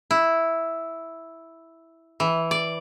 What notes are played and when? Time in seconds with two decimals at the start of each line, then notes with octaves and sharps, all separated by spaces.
0.11 E4
2.20 E3
2.51 D5